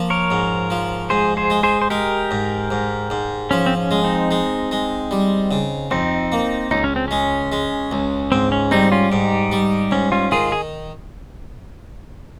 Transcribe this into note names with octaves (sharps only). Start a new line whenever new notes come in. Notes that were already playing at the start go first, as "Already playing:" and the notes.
Already playing: F3 A#3
A#4 C#5
G#2
F3
G#2 G#4 C5
G#4 C5
G#3
G#4 C5
C5
G#3 G4 A#4
G#2
G#2
G#2
F3 C#4
C4
C#4
G#3
C4 D#4
G#3
G#3
G3
C#3
F2 C4 D#4
A#3
C#2 D#4
C#4
C4
G#3 C#4
G#3
C#2
G#2 C4
C#4
G3 C4 D#4
C#4 F4
G#2 D#4 G4
G3
G#2 C#4
C#4 F4
D#3 F4 G#4
G#4